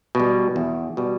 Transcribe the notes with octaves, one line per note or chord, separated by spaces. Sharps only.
B2 G3
E2
B2 G3